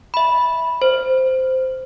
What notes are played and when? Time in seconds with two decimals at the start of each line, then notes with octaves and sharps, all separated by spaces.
0.14 E5 B5
0.82 C5